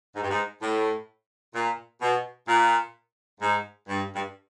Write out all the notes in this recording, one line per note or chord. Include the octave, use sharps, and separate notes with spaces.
G#2
G2
G#2
A2
A#2
B2
A#2
G#2
G2
G2